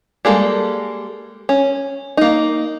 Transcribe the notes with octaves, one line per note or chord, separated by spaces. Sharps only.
G3 G#3 A#3 A4
C#4
A#3 D#4